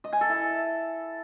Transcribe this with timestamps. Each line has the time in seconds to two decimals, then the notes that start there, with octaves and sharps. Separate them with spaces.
0.04 D#5
0.13 G#5
0.21 A4
0.29 E4